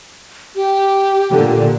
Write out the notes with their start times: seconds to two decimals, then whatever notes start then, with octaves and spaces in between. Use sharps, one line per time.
0.55 G4
1.31 A#2 D3